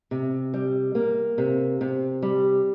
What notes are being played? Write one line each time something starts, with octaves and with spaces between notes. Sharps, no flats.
C3
G3
A#3
C3
C3
G3